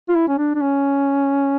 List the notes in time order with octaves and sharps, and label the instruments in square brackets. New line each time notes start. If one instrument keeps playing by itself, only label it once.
[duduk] F4
E4
C#4
D4
D4
C#4